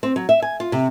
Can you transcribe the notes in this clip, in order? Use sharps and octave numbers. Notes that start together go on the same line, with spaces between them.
C4
F#3
E5
G#5
F4
C3